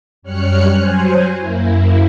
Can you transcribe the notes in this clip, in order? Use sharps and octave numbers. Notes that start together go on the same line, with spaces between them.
F#2 G3 C#5 F6 F#6 C#7
F#3 C5 G#5
F#2 A#3 E4